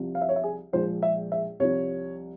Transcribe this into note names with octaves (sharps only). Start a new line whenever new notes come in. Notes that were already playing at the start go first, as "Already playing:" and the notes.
Already playing: C2 C3 F3
F5
E5
C#5
E5
G#4
A#1 A#2 F3 G#3 C5
E5
E5
C2 C3 F3 C#5